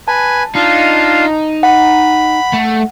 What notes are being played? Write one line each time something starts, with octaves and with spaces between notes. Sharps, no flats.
B4 G#5 A5
D4 D#4 F4 F5
F#5 B5
A3